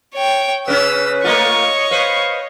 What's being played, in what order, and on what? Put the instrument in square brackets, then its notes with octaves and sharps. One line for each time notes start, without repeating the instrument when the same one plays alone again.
[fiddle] C#5 G5
[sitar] C#3 C#4 [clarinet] B4 [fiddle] E6
[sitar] A3 A#3 F4 [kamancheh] C#5 D#5 [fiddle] C#6
[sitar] B4 C5 [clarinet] F5